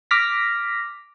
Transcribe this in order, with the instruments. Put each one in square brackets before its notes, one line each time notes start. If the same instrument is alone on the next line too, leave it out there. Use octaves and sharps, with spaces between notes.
[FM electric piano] D6 F6 A#6 B6